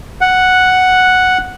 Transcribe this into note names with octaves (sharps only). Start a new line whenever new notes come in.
F#5